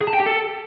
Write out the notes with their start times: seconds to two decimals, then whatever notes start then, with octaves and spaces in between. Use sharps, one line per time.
0.01 G#4
0.08 A5
0.14 G5
0.20 G4
0.27 A4